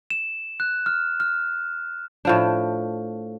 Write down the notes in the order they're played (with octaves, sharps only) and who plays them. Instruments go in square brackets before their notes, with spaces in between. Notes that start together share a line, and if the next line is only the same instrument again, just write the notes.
[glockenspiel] E7
F#6
F6
F6
[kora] A2 F3 D4